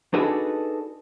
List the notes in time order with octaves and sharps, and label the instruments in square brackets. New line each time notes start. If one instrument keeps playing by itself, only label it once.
[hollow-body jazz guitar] D4 D#4 F#4 G#4 A4 B4